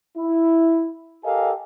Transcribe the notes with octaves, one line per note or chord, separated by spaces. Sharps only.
E4
G4 A4 A#4 D#5 F5 G#5